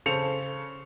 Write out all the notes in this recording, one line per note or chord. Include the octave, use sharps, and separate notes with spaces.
C#3 A4 C5 C#7 E7 F7